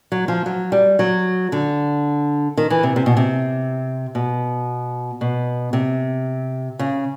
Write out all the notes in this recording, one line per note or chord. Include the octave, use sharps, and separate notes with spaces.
F#3
F3
F#3
G3
F#3
D3
D#3
E3
C3
C3
B2
C3
B2
B2
C3
C#3